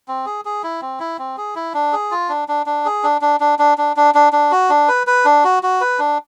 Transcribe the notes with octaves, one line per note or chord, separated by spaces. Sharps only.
C4
G#4
G#4
E4
C4
E4
C4
G#4
E4
D4
G#4
F4
D4
D4
D4
G#4
D4
D4
D4
D4
D4
D4
D4
D4
F#4
D4
B4
B4
D4
F#4
F#4
B4
D4